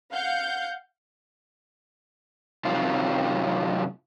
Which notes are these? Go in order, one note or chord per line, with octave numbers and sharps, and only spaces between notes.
F5 F#5 G6
F#2 C3 D#3 F#3 C4 F4